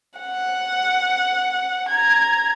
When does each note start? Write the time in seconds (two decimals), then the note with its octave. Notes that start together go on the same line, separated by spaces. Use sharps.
0.19 F#5
1.89 A#5 G#6